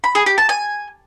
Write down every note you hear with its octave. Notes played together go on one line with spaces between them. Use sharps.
B5
G#4
G4
A5
G#5